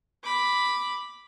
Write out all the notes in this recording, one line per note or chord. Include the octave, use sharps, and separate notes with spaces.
B5 D6